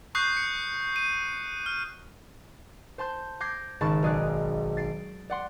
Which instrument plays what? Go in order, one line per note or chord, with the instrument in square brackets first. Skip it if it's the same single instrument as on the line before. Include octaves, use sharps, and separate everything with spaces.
[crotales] C#6 D#6 F#6 G6 C7
C#7
D#7
F6
[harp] C5 A5 C6 G6
D6 G6 G#6 A#6 C7
G#1 C#3 A5 B5 C#6 A6
B1 G#4 D5 F#6
A6 C7 D7
D5 F#5 C6